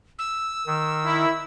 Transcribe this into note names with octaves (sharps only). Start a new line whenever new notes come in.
E6
D#3
E4